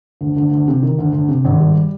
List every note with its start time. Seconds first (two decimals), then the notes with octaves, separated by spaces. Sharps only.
0.21 D2
0.36 D2
0.51 D2
0.68 C3
0.83 D#3
0.99 D2
1.13 D2
1.28 C3
1.45 G#1
1.60 G3